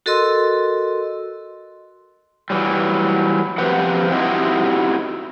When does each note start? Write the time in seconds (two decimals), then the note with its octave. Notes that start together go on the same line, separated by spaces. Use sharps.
0.06 F#4 A4 A#4 D#5 C6 E6
2.50 E3 F#3 G3
3.58 F3 C4 G4 B4 C5 F#5
4.11 C4 D#4 E4 F#4 G4 D#5